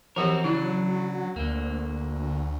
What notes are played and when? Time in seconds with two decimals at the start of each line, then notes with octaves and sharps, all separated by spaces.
0.16 E3 F3 C4 F#4 G4 A#4
0.44 C#3 F#3 D4 E4
1.36 D2 D3 A#3